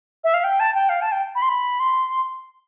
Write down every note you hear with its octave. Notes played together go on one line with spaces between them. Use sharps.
E5
F5
G5
A5
G5
F5
A5
G5
B5
C6
B5
C6